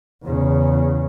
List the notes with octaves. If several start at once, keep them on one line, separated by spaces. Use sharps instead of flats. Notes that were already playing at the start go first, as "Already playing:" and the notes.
E2 C#3